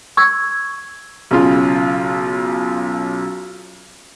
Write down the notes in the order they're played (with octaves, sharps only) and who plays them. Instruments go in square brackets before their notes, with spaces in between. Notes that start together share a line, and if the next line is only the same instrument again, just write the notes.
[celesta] C#6 E6 G#6
[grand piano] B1 C#3 F4